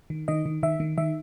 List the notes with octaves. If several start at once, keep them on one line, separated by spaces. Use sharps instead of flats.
D#3
D#3 D#5
D#3
D#3 E5
D#3
D#3 E5